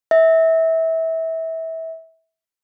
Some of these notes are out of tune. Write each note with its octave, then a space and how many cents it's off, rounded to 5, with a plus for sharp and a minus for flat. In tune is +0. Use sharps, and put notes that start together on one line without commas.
E5 -25